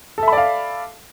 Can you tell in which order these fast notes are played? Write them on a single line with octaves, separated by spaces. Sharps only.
A4 E5 B5 D5 F5